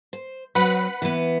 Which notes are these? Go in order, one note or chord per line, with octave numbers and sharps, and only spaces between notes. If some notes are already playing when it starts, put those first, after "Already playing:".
C5
F#3 C4 B4 F#5 B5
E3 B3